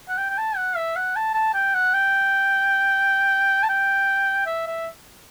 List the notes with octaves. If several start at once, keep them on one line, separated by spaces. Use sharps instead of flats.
F#5
G5
G5
A5
F#5
E5
F#5
A5
A5
G5
F#5
G5
A5
G5
E5
E5